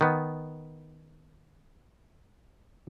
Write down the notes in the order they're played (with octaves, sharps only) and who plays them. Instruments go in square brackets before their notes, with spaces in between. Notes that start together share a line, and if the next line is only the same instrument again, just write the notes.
[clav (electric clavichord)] D#3 B3